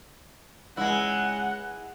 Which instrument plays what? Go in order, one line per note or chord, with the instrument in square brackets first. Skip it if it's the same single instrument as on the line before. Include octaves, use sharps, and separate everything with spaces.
[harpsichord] C#2 [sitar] G#3 E4 [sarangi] F#5